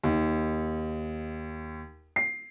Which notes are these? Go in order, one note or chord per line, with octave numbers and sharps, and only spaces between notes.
D#2
C7